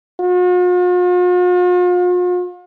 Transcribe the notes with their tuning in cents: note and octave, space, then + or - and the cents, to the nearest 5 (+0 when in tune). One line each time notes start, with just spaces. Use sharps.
F4 +45